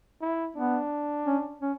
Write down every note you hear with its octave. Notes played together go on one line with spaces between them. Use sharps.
E4
B3 D4
C#4
C#4